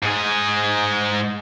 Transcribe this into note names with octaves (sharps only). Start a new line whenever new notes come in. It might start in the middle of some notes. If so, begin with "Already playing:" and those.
G#2 G#4